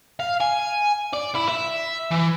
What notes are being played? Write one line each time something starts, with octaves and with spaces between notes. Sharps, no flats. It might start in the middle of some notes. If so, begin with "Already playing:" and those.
F5
G#5
D5
E4
E5
E3